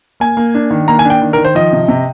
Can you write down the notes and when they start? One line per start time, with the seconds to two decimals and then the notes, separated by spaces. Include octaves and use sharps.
0.20 A#3 G#5
0.37 A#3
0.55 D4
0.71 D#3
0.88 A#3 A#5
0.99 G#5
1.05 D4
1.10 G5
1.22 D#3
1.33 A#4
1.38 D#3
1.45 C5
1.55 F3 D#5
1.73 C3
1.88 C3